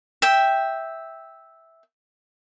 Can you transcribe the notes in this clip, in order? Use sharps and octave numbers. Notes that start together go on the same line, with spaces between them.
E5 G5